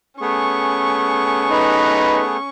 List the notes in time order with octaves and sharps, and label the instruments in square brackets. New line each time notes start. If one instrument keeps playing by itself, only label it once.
[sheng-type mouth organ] A3 B3 G#4 [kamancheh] C#4 C#6
[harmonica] D#4 B4